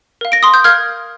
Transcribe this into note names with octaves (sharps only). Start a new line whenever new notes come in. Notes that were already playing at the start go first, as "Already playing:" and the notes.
A#4 F5
A#6 D7
C6 D#6
D#6 G6
A#4 F5 F6 G#6